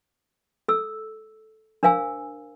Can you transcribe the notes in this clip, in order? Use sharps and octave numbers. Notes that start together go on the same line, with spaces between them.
A4 E6
D4 A#4 C5 F5 G#5 E6